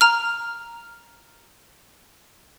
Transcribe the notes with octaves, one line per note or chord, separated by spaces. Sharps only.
A#5 F6